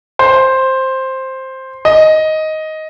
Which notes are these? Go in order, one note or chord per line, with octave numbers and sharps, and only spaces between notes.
C5
D#5